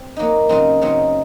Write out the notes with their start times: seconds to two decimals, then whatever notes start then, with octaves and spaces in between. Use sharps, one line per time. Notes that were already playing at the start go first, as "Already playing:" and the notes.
Already playing: C4
0.16 F#3 A#3 D#4
0.49 C#3 F#3 C4 D#4
0.82 C#3 F#3 C4 D#4